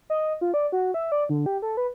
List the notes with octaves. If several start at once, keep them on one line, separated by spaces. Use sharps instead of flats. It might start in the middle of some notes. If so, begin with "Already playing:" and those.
D#5
F4
D5
F#4
E5
D5
D3
G4
A4
B4